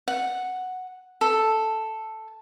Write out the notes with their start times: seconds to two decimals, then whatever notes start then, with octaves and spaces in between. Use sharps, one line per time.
0.08 F#5
1.21 A4